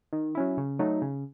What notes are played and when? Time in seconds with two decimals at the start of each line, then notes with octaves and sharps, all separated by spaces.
0.13 D#3
0.35 F#3 C#4 E4
0.57 C#3
0.79 F#3 A3 D#4
1.02 C#3